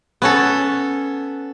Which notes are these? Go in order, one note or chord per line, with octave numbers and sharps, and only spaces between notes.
B3 C#4 A4